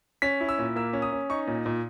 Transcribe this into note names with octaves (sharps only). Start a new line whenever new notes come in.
C#4 B6
E4
E6
A#2
A#3 E6
C#4
D#6
C#4
D#4 C#6
A#2
A#2